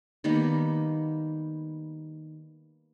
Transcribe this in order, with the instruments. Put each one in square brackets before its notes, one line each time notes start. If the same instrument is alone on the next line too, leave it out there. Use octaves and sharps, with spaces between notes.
[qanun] D#3 G3 A#3 B3